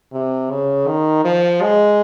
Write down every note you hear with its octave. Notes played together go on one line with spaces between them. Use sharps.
C3
C#3
D#3
F3
G#3